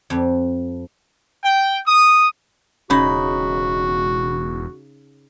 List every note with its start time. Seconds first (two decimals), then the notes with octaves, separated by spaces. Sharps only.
0.10 F2
1.44 G5
1.87 D#6
2.90 E1 C#3 D#4 F#4 B5